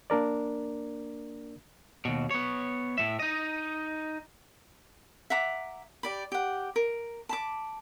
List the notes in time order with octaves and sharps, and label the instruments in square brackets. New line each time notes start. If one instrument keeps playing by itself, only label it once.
[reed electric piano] A#3 D4 A#4 D5
[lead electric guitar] D#2 B2
B3 C#5
A2 E5
D#4 D#5
[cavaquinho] E5 F#5 A#5 D6
G4 D5 B5
G4 F#5
A#4
A5 B5 D6